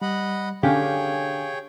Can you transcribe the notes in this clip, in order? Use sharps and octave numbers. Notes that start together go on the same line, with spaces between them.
G3 D#5 F#5 B5
D3 C#4 G4 G#4 C#5 F5 G5 G#5